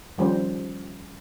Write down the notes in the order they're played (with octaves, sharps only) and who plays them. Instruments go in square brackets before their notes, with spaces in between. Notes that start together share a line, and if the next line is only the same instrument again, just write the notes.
[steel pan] D#3 F3 G3 C#4 C5